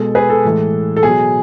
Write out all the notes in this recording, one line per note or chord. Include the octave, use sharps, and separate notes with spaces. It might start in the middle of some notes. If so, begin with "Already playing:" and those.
Already playing: B2 G#3 A4
G#4 B4
A4
A2 E3 G#3
A4
B2 F#3 G#4